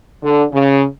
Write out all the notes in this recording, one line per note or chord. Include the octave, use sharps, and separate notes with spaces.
D3
C#3